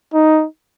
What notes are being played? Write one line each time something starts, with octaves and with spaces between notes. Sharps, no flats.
D#4